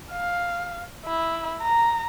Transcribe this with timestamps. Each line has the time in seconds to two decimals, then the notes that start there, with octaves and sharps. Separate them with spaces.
0.12 F5
1.06 E4
1.62 A#5